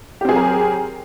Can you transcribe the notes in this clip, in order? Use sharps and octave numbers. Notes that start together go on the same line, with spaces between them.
F#3 C4 G4 G#4 A#4